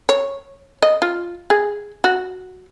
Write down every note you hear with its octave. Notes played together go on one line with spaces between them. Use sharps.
C#5
D#5
F4
G#4
F#4